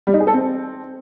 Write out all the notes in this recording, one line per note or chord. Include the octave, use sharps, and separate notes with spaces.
G3
D#4
G#4
A4
C4